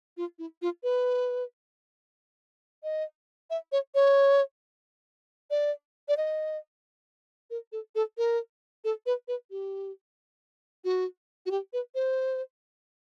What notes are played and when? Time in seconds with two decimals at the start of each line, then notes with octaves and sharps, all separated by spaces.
0.17 F4
0.39 E4
0.62 F4
0.83 B4
2.83 D#5
3.50 E5
3.72 C#5
3.95 C#5
5.50 D5
6.08 D5
6.17 D#5
7.50 A#4
7.72 A4
7.95 A4
8.18 A#4
8.84 A4
9.06 B4
9.28 B4
9.51 G4
10.84 F#4
11.46 F#4
11.51 G4
11.73 B4
11.95 C5